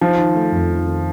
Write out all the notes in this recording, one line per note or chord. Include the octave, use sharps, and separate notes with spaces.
F3 D#4
D#3
A3
F2
D#4
D#3